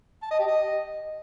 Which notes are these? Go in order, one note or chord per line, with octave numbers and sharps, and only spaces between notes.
A5
D#5
G4
D#5